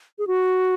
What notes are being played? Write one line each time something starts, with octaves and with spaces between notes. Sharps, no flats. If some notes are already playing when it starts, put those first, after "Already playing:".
G#4
F#4